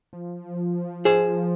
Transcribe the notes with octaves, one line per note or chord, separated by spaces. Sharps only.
F3
G#4 C5